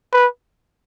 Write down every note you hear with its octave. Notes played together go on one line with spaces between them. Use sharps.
B4